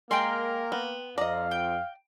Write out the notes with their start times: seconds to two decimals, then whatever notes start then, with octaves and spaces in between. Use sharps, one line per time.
0.11 G#3 A#3 A#4 G5 A#5 C6
0.72 B3
1.18 F2 D5 D#5 F5 A#5
1.51 G5